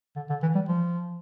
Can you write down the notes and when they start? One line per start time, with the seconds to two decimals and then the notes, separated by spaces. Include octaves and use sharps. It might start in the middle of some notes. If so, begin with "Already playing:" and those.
0.16 D3
0.30 D3
0.43 E3
0.55 G3
0.68 F3